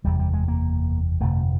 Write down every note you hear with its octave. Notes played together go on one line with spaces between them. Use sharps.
F#1 E2 C3 G3
G3
G#3
A#3
G1 F2 C3 A3